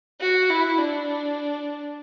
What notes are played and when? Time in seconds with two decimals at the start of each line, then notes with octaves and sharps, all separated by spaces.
0.21 F#4
0.50 E4
0.79 D4